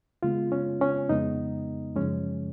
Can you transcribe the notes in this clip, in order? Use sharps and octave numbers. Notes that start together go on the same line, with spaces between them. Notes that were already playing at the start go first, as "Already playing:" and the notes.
C#3 G#3 B3 F4
C#4
C#4
F2 C#3 G#3 B3 D#4
F#2 C#3 F3 G#3 C#4